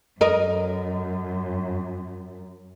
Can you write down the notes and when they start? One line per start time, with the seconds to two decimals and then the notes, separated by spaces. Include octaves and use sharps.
0.21 F#2 A#4 D#5